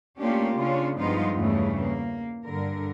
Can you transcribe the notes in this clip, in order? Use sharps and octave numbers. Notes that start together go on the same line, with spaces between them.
A3 A#3 C#4 D4 F4 G4
C#3 C#4 D4 F4
G2 F3 G#3 B3 D#4 F4
E2 G2 C#3 E3 G3 A3
A#3
G2 D3 A#4